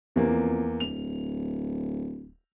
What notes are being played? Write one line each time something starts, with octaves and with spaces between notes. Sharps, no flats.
E2 C3 A#3
F2
D1 F7